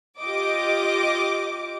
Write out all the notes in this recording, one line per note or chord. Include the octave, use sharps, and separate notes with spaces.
F4 G4 D#5 D6